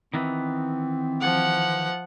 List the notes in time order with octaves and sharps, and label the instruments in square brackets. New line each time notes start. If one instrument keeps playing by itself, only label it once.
[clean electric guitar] D#3 E3 B3 [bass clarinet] C4
[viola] F3 F#5